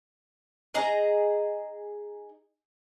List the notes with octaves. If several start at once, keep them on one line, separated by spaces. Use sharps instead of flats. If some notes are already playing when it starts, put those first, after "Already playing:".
D#4 G#4 D#5 A#5